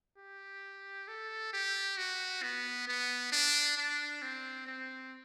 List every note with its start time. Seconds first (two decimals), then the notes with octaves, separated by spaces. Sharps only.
0.18 G4
1.08 A4
1.53 G4
1.98 F#4
2.43 B3
2.88 B3
3.32 D4
3.77 D4
4.22 C4
4.67 C4